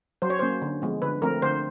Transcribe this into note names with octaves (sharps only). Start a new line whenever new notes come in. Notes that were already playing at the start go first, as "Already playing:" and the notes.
F#3 C5
C#5
A#3 C#4 C5
D3
F3 G#3 B3
D3 B4
F3 A3 C4 A#4
D3 C5